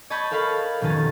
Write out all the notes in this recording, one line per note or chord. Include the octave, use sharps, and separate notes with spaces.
C#5 D#5 A5 B5 C#6 G6
A4 A#4 F5 A5 B5
F1 B2 D#3 C#4 A6